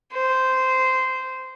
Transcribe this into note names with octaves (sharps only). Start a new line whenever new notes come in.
C5